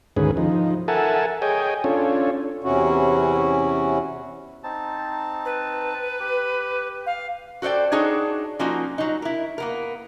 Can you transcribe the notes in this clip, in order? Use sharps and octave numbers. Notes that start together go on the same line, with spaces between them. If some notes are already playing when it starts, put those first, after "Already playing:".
D2 G#2 D#3 C#4 G#4 B4
F3 D#4
A4 A#4 E5 F#5 G#5 A5
G#4 C#5 D#5 G5 G#5
C#4 D4 F4 A4 C#5
E2 C3 C#4 E4 F#4
C4 D#4 A5
B4
G4
F5
F#4 A4 C5 D5 G5
D4 D#4 F#4 G#4 C5 C#5
F3 A#3 C#4 D#4 F4 F#4
F#3 D#4
E4 A#4
A#3 B3 A#4